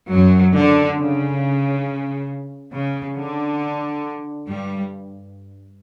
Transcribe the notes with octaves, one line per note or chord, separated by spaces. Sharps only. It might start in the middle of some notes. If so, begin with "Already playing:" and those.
F#2 F#3
D3
C#3
C#3
D3
G2 G3